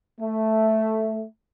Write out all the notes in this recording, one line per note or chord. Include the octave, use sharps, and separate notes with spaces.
A3